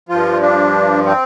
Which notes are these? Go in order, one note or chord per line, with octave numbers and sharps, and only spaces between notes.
G2 F3 F4
D4
C4